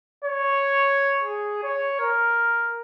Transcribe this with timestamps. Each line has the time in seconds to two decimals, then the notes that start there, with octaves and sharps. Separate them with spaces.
0.25 C#5
1.24 G#4
1.64 C#5
2.00 A#4